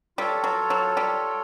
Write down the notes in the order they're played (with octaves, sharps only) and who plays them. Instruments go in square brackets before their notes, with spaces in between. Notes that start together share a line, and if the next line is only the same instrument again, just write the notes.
[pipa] G3 [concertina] F4 A4 C#5
[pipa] F#3
F#3
G3